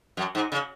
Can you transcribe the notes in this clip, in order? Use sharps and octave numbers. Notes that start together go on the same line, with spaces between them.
F#2
G#2
C#3